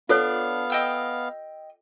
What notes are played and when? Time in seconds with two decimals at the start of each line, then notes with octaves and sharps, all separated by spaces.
0.09 B3 D4 F4 A4 C#5 F5
0.70 D#5 G5 E6